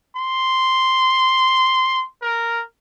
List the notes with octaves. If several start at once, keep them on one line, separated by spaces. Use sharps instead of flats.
C6
A#4